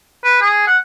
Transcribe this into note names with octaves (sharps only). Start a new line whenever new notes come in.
B4
G#4
F#5